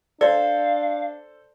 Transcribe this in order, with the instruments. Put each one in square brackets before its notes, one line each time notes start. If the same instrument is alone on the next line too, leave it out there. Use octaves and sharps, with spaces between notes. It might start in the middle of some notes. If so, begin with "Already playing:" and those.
[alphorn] D4 [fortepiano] A4 C5 [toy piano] D5 [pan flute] F5